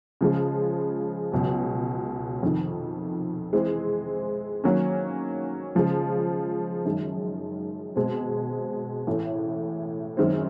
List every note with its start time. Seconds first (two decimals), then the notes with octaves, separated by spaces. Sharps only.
0.21 C#3 F3 G#3
1.32 C#2 B2 F#3
2.43 F2 C3 D#3
3.53 E3 G#3 C4
4.64 D#3 F#3 A#3 C#4
5.75 C#3 F3 G#3
6.85 F#2 D#3 G#3
7.96 B2 G#3 C4
9.07 A1 A2 E3 A3
10.17 F#2 D#3 G#3 C4